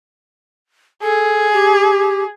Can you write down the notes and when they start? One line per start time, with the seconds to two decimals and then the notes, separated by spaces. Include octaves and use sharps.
1.03 G#4 A4
1.53 G4